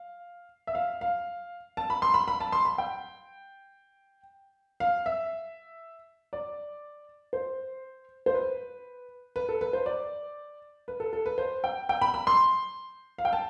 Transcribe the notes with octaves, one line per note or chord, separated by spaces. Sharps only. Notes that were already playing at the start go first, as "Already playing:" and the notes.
Already playing: F5
E5
F5
F5
A5
B5
C6
B5
B5
A5
C6
B5
G5
F5
E5
D5
C5
C5
B4
B4
A4
B4
C5
D5
B4
A4
A4
B4
C5
G5
G5
B5
B5
C6
F5
G5
A5